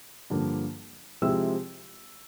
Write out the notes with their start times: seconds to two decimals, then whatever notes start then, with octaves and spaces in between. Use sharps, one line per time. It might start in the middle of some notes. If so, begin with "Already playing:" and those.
0.30 G2 D3 F3 A#3 D4
1.22 C3 F3 G#3 C4 E4 E6